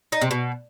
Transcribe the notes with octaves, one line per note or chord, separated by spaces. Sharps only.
D#4
C3
B2